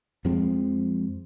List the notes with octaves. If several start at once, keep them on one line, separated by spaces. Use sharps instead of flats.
F2 F3 G#3 C4